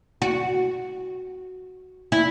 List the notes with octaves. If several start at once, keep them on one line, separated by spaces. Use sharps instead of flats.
F#4
E4